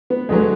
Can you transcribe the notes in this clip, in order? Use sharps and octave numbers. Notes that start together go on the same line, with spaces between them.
B3
D2 D3 F#3 G#3